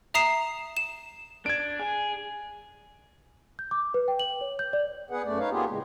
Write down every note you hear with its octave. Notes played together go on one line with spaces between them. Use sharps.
E5 A#5 D#6 C7 E7
E7
D4 G#6 D7
G#4
G6
D6
B4
G5
F#7
C#5
G6
D5
B3 G#4 B4 F#5
F#2 A3 D5
D#4 B4 C#5 F5
A#3 B3 F4 G4 G#4
A2 C#3 G#3